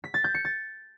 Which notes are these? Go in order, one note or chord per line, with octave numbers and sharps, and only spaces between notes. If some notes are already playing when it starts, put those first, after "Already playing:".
B6
A6
G6
C#7
A6